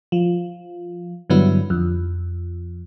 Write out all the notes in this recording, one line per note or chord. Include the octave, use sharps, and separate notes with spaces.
F3
G2 D3 F#3 B3 E4
F2